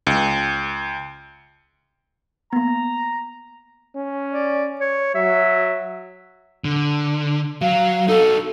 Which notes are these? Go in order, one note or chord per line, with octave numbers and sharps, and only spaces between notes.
C#2
A#3 B3 A#5
C#4
D5
C#5
F#3 E5
D3
F#3 F5
D#4 F#4 A4